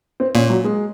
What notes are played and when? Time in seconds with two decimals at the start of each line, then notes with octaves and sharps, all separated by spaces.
0.20 C4
0.35 A#2 C#4
0.50 F#3
0.65 G#3